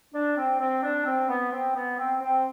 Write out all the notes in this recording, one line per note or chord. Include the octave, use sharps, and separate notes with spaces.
D4
C4
C4
D4
C4
B3
C4
B3
C4
C4